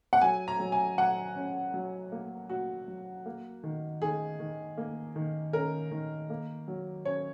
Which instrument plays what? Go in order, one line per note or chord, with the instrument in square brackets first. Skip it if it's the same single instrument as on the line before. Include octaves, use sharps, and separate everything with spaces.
[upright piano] F#5
F#3 G#5
A#5
F#3
G#5
F#3 F#5
C#4
F#3
A#3
A#3 F#4
F#3
A#3
D#3
D#3 G#4
D#3
A#3
D#3
C#4 A#4
D#3
A#3
F#3
C#4 C#5